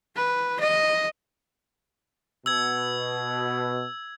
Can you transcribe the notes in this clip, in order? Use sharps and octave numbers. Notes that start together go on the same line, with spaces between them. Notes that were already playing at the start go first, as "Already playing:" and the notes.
B4
D#5
B2 E6 G#6